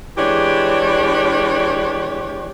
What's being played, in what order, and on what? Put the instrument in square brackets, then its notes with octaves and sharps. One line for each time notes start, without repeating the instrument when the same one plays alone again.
[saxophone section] E3 G#3 D4 G4 C#5